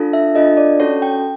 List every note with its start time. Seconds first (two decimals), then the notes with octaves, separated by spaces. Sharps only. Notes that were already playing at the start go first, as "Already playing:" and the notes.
Already playing: D4 F4 A4
0.13 E5
0.35 D4 F4 A4 D#5
0.57 D5
0.80 C#4 F#4 A4 C#5
1.02 G5